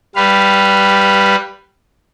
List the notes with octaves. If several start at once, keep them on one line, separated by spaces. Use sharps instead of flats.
G3 B4 F5